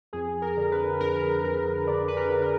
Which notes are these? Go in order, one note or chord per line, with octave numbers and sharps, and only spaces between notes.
F2 G#4
A#4
D3
B4
F2 A#4
F2 A#4
D3 D5
B4
A#4
D3
A#4